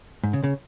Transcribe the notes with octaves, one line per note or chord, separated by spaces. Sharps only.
G#2
C#3
C#3